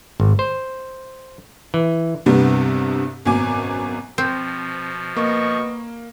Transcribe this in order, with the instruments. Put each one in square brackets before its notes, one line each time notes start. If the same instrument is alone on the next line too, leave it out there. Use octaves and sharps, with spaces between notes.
[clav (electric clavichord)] G#1
C5
E3
[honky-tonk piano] C2 G2 C3 G3 B3
G#1 F#2 B2 G#5 D6
[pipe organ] B2 F3 [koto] C4
[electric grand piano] A#3 [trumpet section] B3 D#5 C#6